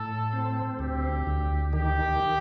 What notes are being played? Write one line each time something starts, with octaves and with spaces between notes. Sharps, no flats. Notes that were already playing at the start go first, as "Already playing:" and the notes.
Already playing: A2 A4
C4
D2 G4
D2
D#3 G4
D#3